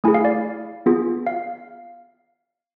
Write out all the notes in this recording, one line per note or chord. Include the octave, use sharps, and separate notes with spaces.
A3 E4 G#4 G#5
F5
D5
B3 F4 G#4
F5